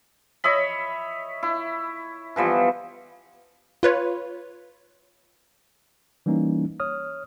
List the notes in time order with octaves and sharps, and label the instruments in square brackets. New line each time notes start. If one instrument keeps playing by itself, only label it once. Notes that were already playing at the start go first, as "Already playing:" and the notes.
[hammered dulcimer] C#5 D#5 E5 B5
E4
E3 F3 G3 B3
[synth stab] F4 B4 C#5
[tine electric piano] E3 G3 A#3 C#4 D#4
C#5 D#6 F6